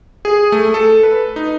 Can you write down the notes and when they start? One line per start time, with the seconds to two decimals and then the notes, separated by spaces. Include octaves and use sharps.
0.25 G#4
0.52 A3
0.74 A4
1.03 B4
1.36 D#4